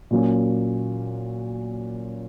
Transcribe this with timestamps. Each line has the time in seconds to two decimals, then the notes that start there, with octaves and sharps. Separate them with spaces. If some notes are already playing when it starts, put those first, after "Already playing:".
0.11 A#2 F#3 A#3 C#4